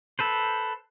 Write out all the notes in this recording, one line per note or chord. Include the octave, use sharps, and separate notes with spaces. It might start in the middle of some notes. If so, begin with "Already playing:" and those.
A4 B4 C5